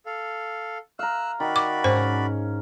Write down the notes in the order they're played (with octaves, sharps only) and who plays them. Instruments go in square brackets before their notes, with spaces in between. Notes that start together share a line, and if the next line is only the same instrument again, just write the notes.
[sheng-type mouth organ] A4 F5
[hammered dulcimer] F5 A#5 [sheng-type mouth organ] E6 F#6
[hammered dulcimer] D#3 [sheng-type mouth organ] F#4 D5 B5
[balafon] D6
[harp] G#2 [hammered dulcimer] C#4 [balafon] C5